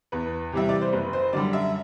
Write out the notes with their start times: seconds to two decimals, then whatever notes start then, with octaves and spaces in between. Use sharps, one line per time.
0.12 E2 B4
0.52 C3 E3 G3 E5
0.69 D5
0.82 C5
0.92 F#1 B4
1.13 C5
1.33 F#2 D3 G3 D5
1.53 E5